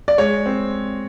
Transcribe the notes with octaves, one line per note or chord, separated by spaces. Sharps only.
D5
G#3 C#5
C4